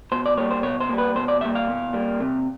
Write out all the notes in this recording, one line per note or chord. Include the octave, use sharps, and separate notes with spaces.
B2 C5
D5
G3 A#3 C#5
C5
B2 C#5
C5
G3 A#3
B4
B2 C5
D5
G3 A#3 E5
F5
B2
G3 A#3
C3